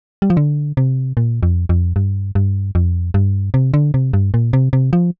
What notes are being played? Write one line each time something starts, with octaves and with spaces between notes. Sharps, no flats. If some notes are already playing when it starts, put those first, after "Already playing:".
G3
F3
D3
C3
A#2
F2
F2
G2
G2
F2
G2
C3
D3
C3
G2
A#2
C3
C3
F3